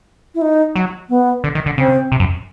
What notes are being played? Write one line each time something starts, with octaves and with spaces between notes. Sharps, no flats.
E4
D#4
F#3
B3
D3
D#3
D3
C#3 C4
C3
F#2